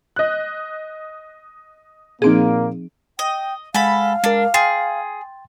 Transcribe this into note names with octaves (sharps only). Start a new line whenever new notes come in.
D#5 F#6
A#2 F3 A#3 C4 D#4 G#4 D7 D#7
D#5 G5
G#3 A4 F5 F#5 G#5 B5
G#3 D4 A#4
G#4 G5 C6 A6